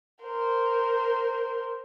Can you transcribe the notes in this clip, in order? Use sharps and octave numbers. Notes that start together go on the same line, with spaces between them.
A#4 C5